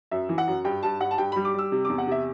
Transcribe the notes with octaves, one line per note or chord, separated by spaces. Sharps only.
F#2 E5
E3
F#5
F#2
G2 G5
G2 A5
G2 F#5
A5
G2 G5
G3 B5
D6
G3 E6
C3
D6
E2
F#5
C3 E5